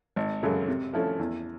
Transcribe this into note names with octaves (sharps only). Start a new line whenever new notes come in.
G#1
F#2 C#3 F#3 A3
C3
F3 A3 C#4 E4
E2